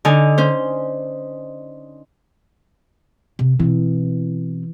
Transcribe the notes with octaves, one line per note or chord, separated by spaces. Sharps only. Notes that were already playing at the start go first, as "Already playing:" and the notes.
D3 D#4 G#5
C#4 C5
C3
B2 E3 C4